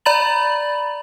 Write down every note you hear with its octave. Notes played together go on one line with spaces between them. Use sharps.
D5 A#5 B5 A6 F#7